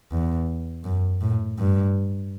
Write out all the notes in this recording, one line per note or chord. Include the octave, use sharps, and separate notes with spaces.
E2
F#2
A2
G2